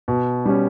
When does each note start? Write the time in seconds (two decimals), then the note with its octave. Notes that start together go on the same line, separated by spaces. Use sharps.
0.08 B2
0.45 G3 C#4